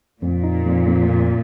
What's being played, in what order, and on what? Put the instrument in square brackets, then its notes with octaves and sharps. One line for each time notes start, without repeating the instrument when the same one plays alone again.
[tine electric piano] F2 [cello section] A#2
[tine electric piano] D#4
F2
F2
F2